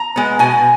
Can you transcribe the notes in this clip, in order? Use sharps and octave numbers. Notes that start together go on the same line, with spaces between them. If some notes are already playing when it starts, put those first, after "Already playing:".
Already playing: A#5
G#3 B3
B2 G#5